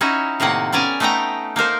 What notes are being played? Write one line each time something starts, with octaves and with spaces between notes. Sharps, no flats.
C#4 D#4 E4 F#4 C#5
A2 C3 D#3 A#3 F#5
B3 C#4 D5 G#5 A#5
A3 B3 D#4 F#5 G5 A#5
A#3 D#4 A#4 C5